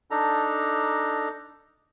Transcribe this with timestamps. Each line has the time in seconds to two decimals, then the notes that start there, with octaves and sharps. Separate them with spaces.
0.11 D4 D#4 A4 A#5